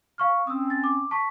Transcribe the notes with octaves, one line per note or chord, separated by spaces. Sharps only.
F5 C#6 F6
C4 C#4 D#6 E6
A6
D6
A5 C#6 B6